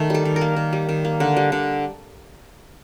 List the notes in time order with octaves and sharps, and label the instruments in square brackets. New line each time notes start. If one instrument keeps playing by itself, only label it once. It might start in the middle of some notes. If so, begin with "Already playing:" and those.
Already playing: [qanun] D#3 A3
G3 A4
D#3
A#4
A#3
D#3
G3
D#3
A#3
D3
G3
D3